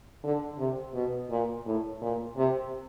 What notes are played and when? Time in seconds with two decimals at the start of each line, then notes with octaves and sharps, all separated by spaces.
0.24 D3
0.58 C3
0.94 B2
1.30 A#2
1.66 A2
2.02 A#2
2.37 C3